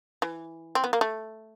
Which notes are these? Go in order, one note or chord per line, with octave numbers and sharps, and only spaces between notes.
E3
C4
B3
A#3
A3